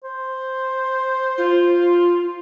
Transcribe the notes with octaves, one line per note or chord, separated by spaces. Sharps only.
C5
F4